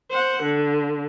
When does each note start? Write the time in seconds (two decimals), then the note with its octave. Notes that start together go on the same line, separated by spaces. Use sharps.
0.10 C5 F#5
0.43 D3